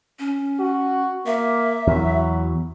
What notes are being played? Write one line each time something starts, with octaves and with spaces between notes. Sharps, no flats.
C#4
F#4
A#3 E5
E2 F#3